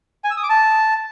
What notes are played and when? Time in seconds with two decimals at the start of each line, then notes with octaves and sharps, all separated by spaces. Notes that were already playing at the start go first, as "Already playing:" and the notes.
0.24 G#5
0.31 E6
0.37 D#6
0.43 D6
0.49 A5